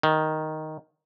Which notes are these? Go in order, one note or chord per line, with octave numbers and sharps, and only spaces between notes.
D#3